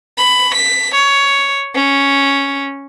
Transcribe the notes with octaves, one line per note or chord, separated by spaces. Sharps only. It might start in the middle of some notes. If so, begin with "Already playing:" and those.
B5
B6
C#5
C#4